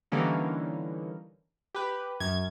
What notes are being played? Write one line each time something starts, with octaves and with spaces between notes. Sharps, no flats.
D3 E3 G3 A#3 C#4 D#4
G4 B4
F#2 G#6